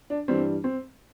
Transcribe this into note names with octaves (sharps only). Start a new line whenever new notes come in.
D4
G2 E3 G3 C4
C4